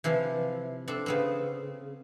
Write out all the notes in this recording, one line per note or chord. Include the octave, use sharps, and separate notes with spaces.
C3 E3 F3
C4 D4 A4
C#3 B3 C4